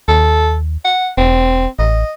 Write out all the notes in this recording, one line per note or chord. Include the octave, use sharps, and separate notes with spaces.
D#2 A4
F#5
E1 C4
A1 D#5